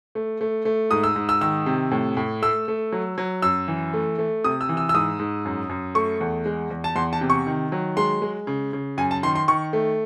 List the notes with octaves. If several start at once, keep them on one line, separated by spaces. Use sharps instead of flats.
A3
A3
A3
G#2 D#6
E6
G#2
E6
D#3 E6
C3
A2
A2
A3 E6
A3
F#3
F#3
F#2 E6
E3
A3
A3
C3 D#6
E6
E3
E6
E6
G#2 D#6
G#2
F#2
F#2
A3 C#6
E2
G#3
E2
A5
E2 C6
A5
C3
C#6
D#3
F#3
G#3 C6
G#3
C#3
C#3
F#2 G#5
A5
D#3 C6
C6
D#3 C#6
A3